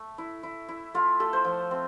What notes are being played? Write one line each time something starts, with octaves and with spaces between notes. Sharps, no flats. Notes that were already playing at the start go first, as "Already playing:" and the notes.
Already playing: A3
E4
E4
E4
A3 F4
A3 A4
C5
F3
C4